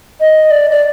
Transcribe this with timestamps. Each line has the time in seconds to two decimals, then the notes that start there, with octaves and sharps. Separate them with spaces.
0.20 D#5
0.51 D5
0.71 D5